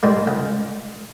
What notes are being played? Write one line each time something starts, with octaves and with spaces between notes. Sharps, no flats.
G#2 G3 G#3
C#2